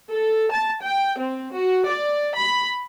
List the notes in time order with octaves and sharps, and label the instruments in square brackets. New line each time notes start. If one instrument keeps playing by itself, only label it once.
[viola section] A4
A5
G5
C4
F#4
D5
B5